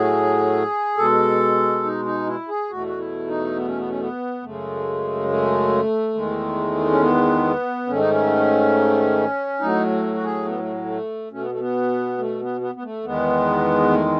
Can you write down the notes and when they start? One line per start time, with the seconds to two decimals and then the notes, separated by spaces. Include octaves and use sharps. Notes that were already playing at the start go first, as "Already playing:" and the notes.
Already playing: A2 F#3 A3 G#4
0.98 B2 G#3 A4
1.84 D#4
2.05 D#4
2.27 E4
2.48 G#4
2.70 E2 B2 A3 F#4
2.87 F#4
2.99 E4
3.27 D#4
3.56 B3
3.67 C#4
3.78 B3
3.89 C#4
4.00 B3
4.42 F#2 C#3 G#3 A3
5.28 A3
6.15 E2 D#3 G#3
6.90 C#4
7.01 B3
7.87 G#2 D#3 A3 C#4
7.99 D#4
8.10 C#4
9.60 A2 F#3 A3 D#4
10.15 F#4
10.24 G#4
10.46 B3
10.59 A3
10.85 A3
11.31 B2 A3 C#4
11.41 B3
11.51 A3
11.60 B3
12.18 A3
12.40 B3
12.61 B3
12.75 B3
12.83 A3
13.04 E2 D#3 G#3 B3
13.91 A3